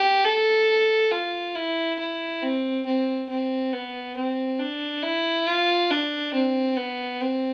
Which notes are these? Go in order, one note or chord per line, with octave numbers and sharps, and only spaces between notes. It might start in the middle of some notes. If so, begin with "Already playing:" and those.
Already playing: G4
A4
F4
E4
E4
C4
C4
C4
B3
C4
D4
E4
F4
D4
C4
B3
C4